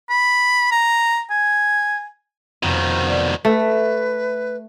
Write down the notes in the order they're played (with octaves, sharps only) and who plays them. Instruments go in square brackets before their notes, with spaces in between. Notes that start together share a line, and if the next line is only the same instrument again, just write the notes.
[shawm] B5
A#5
G#5
[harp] F1 F2 [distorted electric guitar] B2 D#3
[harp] D5
[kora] A3 [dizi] B4